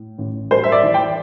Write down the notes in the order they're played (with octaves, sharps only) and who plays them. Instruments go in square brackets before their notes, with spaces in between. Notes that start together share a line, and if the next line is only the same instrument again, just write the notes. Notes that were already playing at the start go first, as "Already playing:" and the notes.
Already playing: [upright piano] A2
A1
G3 C5
E5
D5
E3
G5